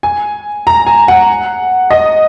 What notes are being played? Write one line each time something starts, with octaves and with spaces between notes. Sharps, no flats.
G#5
A#5
G#5
F#5
D#5